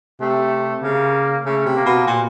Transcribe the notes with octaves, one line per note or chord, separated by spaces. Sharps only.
C3 A3
C#3 A#3
C#3 A3
C3
A#3
B2
A#2